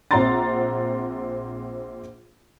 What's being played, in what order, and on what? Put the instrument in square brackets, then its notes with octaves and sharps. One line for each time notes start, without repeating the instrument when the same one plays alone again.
[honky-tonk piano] A#1 C4 F#5 A#5 C6 A6